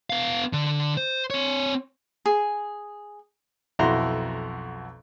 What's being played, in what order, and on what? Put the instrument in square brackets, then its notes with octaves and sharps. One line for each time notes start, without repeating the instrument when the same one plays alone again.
[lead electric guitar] B3 F5
D3
C5
C4 C#5
[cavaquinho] G#4
[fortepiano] B1 F2 E4 F#4 A#5 C6